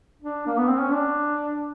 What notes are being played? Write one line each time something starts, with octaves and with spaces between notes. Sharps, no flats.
D4
A#3
B3
C4
C#4
D4